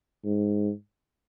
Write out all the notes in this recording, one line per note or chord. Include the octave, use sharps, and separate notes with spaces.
G#2